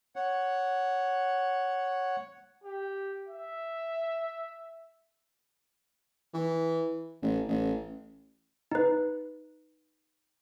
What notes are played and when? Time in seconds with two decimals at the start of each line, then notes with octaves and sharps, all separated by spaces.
0.16 C#5 F#5
2.64 G4
3.28 E5
6.34 E3
7.22 A1
7.48 A1
8.72 D#4 B4